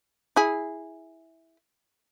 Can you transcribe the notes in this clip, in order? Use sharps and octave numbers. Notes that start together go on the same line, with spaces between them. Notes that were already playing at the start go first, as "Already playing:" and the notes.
E4 G#4